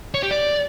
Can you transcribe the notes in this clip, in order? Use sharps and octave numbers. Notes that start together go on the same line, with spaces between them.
C#5
G4
D5